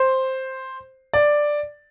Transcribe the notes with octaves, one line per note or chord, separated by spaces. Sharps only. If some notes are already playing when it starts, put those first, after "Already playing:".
Already playing: C5
D5